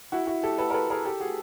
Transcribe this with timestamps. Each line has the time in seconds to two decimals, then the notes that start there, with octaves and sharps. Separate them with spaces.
0.12 E4 F#4
0.27 E4 F#4
0.43 G4 A4
0.58 A4 B4
0.70 A#4
0.74 A4 B4
0.90 G#4 A#4
1.05 G4 A4
1.20 F#4 G#4